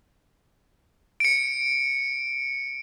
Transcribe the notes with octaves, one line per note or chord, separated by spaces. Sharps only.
C#7 D7